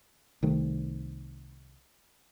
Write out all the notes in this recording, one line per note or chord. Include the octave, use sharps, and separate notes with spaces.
C2 D#3 A3